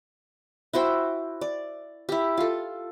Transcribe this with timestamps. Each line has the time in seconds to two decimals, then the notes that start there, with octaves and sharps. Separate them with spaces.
0.73 E4 F#4 C5 G5
1.41 D5
2.09 E4 G4
2.37 F4 A4